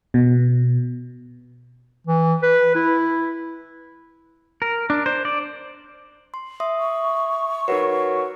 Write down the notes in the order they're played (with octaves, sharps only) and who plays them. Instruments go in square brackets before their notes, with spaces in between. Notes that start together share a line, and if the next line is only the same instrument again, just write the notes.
[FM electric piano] B2
[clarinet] E3
B4
E4
[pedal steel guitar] A#4
D4
C5
D5
[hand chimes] C6
E5 C6 D#6
[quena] C#6
[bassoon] F#3 [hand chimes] D#4 A#4 B4